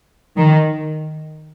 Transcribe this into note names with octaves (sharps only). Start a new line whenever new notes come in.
D#3